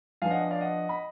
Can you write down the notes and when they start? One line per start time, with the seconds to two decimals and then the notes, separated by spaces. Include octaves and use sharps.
0.22 F3 B3 D4 F5 G#5
0.31 D#5 F#5
0.51 D5 F5
0.61 D#5 F#5
0.89 B5